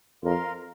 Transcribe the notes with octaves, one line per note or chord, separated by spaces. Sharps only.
F2 F4 A#4 F5 C6